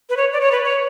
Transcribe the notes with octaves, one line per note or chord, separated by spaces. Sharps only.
B4
C#5
D5
C#5
B4
C#5